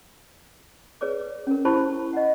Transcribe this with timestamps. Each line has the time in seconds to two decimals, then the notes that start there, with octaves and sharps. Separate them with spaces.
1.01 G#4 B4 C#5 D5 D6
1.47 C#4 A#4
1.65 E4 G4 C5 A5 B5 C#6
2.13 D#5 F#5